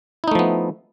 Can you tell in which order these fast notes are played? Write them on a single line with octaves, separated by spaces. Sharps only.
E4 D#4 A3 F3 B3